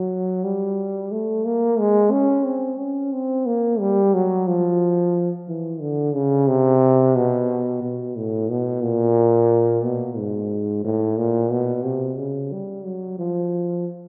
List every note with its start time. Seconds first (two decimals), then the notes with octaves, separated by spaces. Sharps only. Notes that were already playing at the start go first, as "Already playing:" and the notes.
Already playing: F#3
0.44 G3
1.12 A3
1.45 A#3
1.79 G#3
2.12 C#4
2.45 C4
2.79 C#4
3.12 C4
3.46 A#3
3.80 G3
4.14 F#3
4.48 F3
5.48 E3
5.81 D3
6.14 C#3
6.48 C3
7.16 B2
7.82 B2
8.16 A2
8.50 B2
8.83 A#2
9.84 B2
10.17 G#2
10.84 A2
11.18 A#2
11.51 B2
11.85 C3
12.18 C#3
12.52 G3
12.85 F#3
13.19 F3